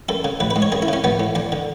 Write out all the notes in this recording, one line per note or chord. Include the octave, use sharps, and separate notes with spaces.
F#2 A4
C#3
A1 B4
B4
G#2
C#5
F#2 G#4
E4
C#3 C#4
A1 B3
A2
E2 D4
D3